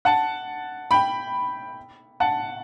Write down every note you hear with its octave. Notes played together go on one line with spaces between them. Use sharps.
F#5 A5
G5 B5
F#5 A5